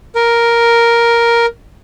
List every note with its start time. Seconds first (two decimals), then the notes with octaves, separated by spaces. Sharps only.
0.15 A#4